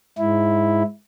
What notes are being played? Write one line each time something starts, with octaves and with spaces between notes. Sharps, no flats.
G#2 E4